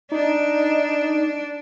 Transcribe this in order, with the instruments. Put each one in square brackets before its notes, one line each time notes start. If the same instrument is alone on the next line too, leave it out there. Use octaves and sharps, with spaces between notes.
[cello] D4 [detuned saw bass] D#4